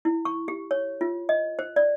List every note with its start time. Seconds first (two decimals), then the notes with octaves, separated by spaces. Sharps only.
0.05 E4
0.25 C#6
0.48 G4
0.71 C#5
1.01 F4
1.29 D#5
1.59 C5
1.76 D5